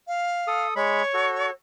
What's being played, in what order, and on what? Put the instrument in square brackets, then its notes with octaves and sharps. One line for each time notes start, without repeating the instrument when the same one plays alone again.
[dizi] F5
[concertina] A4 D#6
[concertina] G#3 B5 [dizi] C#5
[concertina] F#4 A4